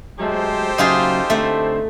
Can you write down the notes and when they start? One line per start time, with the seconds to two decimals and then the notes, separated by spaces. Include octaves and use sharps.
0.20 F#3 G#3 A3 G4 A4 C5
0.78 C#3 F#3 D#4 F4 G#4 E5
1.30 D3 A3 C4